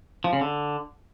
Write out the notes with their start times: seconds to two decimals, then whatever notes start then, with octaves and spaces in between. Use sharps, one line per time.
0.24 F3
0.33 C#3
0.41 D3